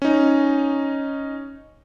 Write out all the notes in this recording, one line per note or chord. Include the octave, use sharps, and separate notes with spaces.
C#4 D#4